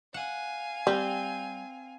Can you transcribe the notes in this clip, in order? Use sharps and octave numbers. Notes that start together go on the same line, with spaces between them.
F5 F#5 G#5
G3 C4